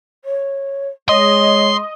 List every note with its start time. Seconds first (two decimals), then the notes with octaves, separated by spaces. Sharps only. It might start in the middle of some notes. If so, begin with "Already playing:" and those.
0.25 C#5
1.09 G#3 C#5 D#5 C6